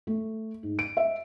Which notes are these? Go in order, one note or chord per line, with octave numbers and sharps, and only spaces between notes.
A3
G#2
D7
E5